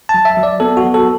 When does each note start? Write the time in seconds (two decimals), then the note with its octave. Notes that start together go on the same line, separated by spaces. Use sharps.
0.09 A5
0.14 F#3
0.25 E5
0.37 F#3
0.43 D5
0.60 B3 A4
0.77 F#4
0.84 F#3
0.94 A4